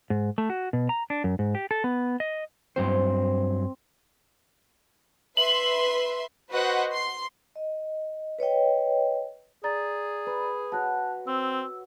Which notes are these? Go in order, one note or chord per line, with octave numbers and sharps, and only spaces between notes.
G#2
A3
F#4
B2
A#5
D4
F#2
G#2
G4
A4
B3
D#5
G2 F#3 C4 C5
B4 E5 C6 F#7
F#4 B4 C5 D#5 F#5
C6
D#5
B4 C#5 D#5 G5
G#4 D5 A#5 A6
B4
F#4 C#5 A5 F#6
C4 E6